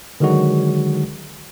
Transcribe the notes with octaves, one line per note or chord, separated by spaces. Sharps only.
D3 D#3 F#3 G#3 F#4